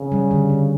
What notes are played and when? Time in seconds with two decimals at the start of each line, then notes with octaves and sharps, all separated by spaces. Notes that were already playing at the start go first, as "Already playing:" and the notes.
Already playing: C#3
0.12 G3
0.31 D3
0.50 D3